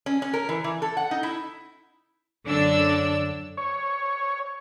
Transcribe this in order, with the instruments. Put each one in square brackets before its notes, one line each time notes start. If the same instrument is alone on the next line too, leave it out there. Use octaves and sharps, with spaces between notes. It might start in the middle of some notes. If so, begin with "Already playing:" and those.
[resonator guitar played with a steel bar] C#4
C#4
A#4
E3
E3
A4
F#5
D#4
E4
[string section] F#2 D3 D4 C#5 E6
[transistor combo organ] C#5